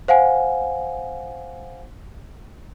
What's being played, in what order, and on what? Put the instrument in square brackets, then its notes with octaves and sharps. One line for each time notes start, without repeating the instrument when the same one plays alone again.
[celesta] C5 F5 F#5 G#5